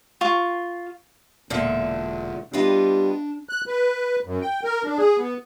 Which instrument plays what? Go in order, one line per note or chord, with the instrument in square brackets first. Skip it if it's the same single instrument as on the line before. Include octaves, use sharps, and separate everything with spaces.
[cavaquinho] F4 C#6
[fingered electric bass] E1 [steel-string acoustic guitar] A#2 D3 E5
[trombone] G3 [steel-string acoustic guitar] B3 F4 D#5 [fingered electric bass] D4
[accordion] F#6
B4
F#2
G5
A#4
D4
G#4
B3